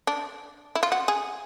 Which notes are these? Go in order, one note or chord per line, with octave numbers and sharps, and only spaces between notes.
D4
E4
F4
F#4
G#4